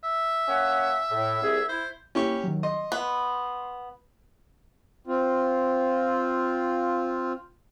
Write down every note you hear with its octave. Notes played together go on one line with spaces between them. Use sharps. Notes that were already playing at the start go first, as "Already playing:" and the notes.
E5
A#3 C#4 F#5
A2
C2 G#4
E4 C5
A#3 C#4 E4 G4 C#6
D#3 F#3
D#5 C6
B3
C4 F4